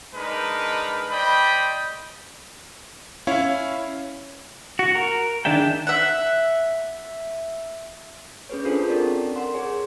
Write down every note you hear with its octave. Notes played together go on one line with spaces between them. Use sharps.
G#3 D4 D#4 A#4 B4
C5 D5 D#5 G5 B5
C#4 E4 C#5 F5
F#4
A#4
D#3 D4 G#4 E5 G5
E5 F#5
C#4 G#4 B4 C#5
D4 F4 G#4 A4 C5
C4 G4 A4 A#4 C#5 D5
A#4 F#5 C6
G#4 C#5 G#5